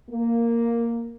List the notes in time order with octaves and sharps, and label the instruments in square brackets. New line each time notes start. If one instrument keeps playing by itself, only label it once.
[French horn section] A#3